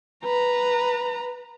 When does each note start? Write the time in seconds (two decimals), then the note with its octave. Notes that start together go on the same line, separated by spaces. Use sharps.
0.24 B4 A#5